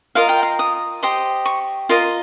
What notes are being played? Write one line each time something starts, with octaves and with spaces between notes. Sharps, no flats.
F4 A#4 D#5 F5
G5
F5
D#6
G4 C5 D#5 D#6
C#6
F4 A#4 D#5 C6